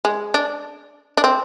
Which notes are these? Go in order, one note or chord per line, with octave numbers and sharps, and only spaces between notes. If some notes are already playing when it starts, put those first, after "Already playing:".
G#3
D4
D4
C4